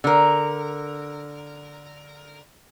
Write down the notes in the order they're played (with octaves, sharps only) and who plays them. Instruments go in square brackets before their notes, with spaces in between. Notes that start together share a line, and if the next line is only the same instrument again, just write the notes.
[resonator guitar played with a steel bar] D3 A#4